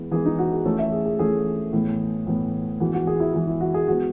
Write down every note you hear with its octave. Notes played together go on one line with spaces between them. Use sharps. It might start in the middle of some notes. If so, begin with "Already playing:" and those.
Already playing: E3 G#3 B3
E3 G#3 B3 G#4
D#4
F#4
G#4
E3 A3 C#4 A4
E5
G#4
G#4
E3 A3 C#4 G#4
A2 E3 B3
A2 E3 B3
E3 G#3 B3 F#4
F#4
G#4
E4
E3 G#3 B3 E4
E4
F#4
G#4
E3 G#3 B3 F#4